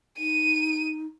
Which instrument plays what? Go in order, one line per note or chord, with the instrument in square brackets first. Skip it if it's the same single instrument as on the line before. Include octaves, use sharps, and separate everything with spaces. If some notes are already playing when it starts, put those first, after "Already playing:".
[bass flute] D#4 [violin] D#7